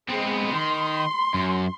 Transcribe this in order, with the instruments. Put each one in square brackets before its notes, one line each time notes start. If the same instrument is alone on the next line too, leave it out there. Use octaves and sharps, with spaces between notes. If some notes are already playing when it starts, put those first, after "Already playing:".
[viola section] G#3 [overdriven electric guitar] B3 C4
[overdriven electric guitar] D#3 [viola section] C6
[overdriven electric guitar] F#2